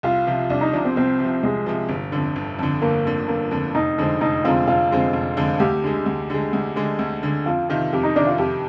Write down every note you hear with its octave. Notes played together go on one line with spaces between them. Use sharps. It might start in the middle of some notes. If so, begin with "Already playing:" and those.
C2 F4
C3 F3
C2 D4
D#4
C3 F3 D4
C4
C2 C4
C3 F3
C2 G#3
C3 F3
G1
F2 D3
G1
F2 D3
G1 A#3
F2 D3
G1 A#3
F2 D3
F1 D#4
F2 D3 G#3 C4
F1 D#4
F2 D3 G#3 C4 F4
F1 F4
F2 D3 G#3 C4
F1
F2 D3 G#3 C4
D2 G4
D3 G#3
D2
D3 G#3
D2
D3 G#3
D2
D3 G#3
F2 F4
C3 D#3 F4
F2 G4
D#4
C3 D#3 D4
F4
F2 G4